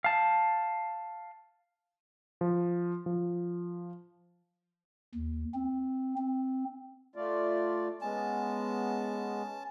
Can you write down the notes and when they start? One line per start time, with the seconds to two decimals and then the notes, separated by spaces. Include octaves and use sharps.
0.04 F5 A5
2.41 F3
3.06 F3
5.15 D#2
5.54 C4
6.18 C4
7.16 A3 F4 D5
8.01 G#3 B3 C#4 A5